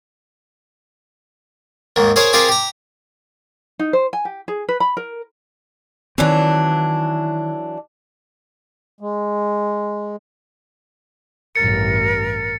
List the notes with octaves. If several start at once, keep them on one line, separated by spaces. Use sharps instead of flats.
D#2 G#2 D#3
G#4 A#4 C5 C#5 F5
C4 F4 G4 G#4 A#4 F5
G4 A#5
D#4
C5
G#5
G4
G#4
B4
B5
A#4
D#3 E3 F#3 C4 D4
G#3
A1 G2 A#4 A6 C#7